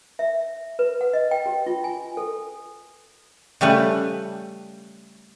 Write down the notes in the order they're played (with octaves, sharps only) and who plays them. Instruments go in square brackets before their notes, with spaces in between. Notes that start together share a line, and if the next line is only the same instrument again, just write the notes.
[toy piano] E5
B4
F#5
D#5
G5
G4
F4
G#5
A4
[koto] C#3 G3 A3 B4